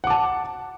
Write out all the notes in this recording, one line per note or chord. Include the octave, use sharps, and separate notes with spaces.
F#5 A5 D6